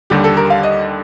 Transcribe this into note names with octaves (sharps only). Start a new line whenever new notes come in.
D#2 D3 G3 G4
A4
A#4
F5
D#5